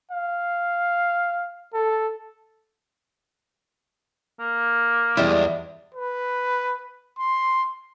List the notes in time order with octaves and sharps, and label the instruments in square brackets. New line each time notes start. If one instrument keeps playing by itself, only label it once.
[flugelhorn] F5
A4
[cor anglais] A#3
[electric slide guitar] E2 E4 [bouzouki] G3 G#3
[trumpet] B4
C6